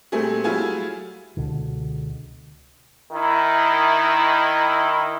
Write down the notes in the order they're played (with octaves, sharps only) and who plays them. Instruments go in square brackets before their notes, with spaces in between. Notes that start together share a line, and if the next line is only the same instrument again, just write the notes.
[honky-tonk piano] A#2 G3 A3 C4 G#4
F#3 G3 A3 E4 F4 G#4
[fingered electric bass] C#2 B2 D3
[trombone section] D#3 E4